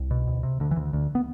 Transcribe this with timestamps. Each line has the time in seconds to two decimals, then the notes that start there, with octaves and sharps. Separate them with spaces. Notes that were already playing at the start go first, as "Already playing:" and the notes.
Already playing: C2
0.11 B2
0.27 D2
0.43 C3
0.60 D2 D3
0.71 E3
0.76 D2
0.93 D2
1.15 B3